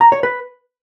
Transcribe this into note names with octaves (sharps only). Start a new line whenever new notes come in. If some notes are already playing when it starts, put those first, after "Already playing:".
A#5
C#5
B4